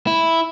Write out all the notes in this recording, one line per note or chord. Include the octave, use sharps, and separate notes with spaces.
E4